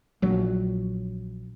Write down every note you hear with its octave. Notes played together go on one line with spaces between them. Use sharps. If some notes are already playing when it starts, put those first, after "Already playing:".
A#1 F#3